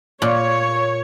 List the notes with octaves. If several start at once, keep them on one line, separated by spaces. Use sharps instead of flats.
A#2 C#5